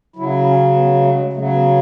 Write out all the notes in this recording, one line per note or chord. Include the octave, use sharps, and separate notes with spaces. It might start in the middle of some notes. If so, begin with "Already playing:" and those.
C#3 F#3 E4
C#4
B3
A3
G#3
C#3 F#3 A3
B3